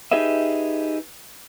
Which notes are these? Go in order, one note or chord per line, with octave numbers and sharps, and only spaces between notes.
D#4 G4 G#4 B4 D#5 E5